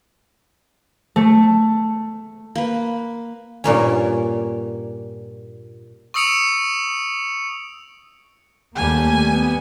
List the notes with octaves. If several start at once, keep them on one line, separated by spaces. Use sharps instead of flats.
A3
A#3 B4
G2 A#2 A#3 C#4
C#6 D#6 E6 C#7 D7 F7
D#2 G3 A3 A#3 G#5
B3